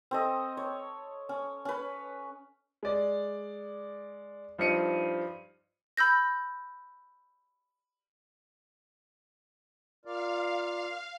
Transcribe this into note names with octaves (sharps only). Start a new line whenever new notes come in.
C4 A4 D#5
C#5
C#4
C#4 B4
G#3 D5
G2 F3 D#4 C#7 D#7
B5 E6 G6 A#6
F4 A#4 D5 F5